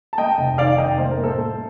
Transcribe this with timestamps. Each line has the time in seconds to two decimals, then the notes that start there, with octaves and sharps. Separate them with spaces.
0.13 A5
0.18 A3 D#5 G5
0.38 F1
0.58 D#3 D5 F5
0.78 F1 D#5 G5
0.98 A3 C5
1.11 A#4
1.18 A2
1.24 A4 C5
1.38 A3